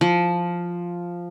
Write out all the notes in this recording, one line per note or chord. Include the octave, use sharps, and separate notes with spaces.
F3